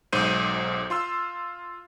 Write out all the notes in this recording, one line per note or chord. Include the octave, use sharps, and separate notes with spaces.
B1 G#2 C5 G6 D#7
F4 C6 E6